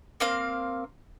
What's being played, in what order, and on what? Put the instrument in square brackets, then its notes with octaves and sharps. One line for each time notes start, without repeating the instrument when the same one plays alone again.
[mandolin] A#3 C4 F5